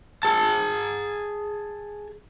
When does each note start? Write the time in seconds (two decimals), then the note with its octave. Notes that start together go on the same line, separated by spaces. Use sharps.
0.23 G#4 A5